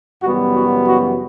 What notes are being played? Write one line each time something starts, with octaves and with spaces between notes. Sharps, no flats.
F#2 C#3 E3 G3 B3 F#4
F#4
F#4